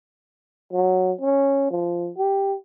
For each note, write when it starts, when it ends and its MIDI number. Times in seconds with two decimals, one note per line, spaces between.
0.73 1.12 54
1.21 1.70 61
1.71 2.10 53
2.18 2.56 67